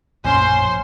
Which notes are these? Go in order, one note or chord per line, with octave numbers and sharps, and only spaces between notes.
A#1 F#2 A2 C#4 C5 G#5 C6